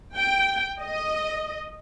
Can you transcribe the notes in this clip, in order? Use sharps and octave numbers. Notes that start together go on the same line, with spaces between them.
G5
D#5